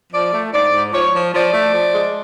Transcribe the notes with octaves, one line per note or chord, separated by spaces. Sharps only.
F3 D5
A3
G#2 D5
G#2
F3 C#5
F3
F3 D5
A3
F3
G#3